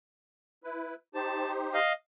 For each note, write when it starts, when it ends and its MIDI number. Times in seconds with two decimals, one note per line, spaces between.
0.64 0.95 64
0.64 0.95 71
1.14 1.79 63
1.14 1.79 67
1.14 1.79 72
1.14 1.51 81
1.74 1.93 75
1.74 1.93 77